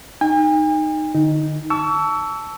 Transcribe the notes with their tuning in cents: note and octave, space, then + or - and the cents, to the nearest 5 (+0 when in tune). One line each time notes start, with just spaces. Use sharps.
D#4 -10 G#5 -45
D3 +35 D#4 +0
A5 +0 C#6 +35 E6 +0